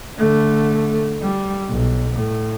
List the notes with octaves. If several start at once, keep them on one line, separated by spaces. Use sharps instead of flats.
D3 A3
G3
B1
A2